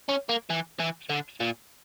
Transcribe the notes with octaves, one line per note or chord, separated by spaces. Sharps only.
C#4
A#3
E3
E3
D3
A#2